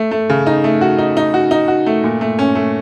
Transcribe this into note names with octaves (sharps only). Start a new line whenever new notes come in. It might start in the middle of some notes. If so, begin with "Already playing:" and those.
Already playing: A3
A3
C#3
D#4
A3
F#4
D#4
D#4
F#4
D#4
F#4
A3
A#2
A3
C#4
A3